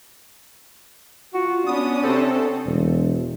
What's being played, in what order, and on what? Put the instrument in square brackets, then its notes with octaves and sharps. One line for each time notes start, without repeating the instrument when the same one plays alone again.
[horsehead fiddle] F4 [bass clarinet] F#4
[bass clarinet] B3 [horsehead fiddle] C#4 D4 [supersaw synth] D#6
[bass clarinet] C3 [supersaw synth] C4 A4
[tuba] E1